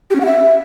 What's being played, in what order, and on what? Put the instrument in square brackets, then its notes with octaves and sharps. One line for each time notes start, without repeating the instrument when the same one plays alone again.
[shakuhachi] G4
C#4
F#5
E5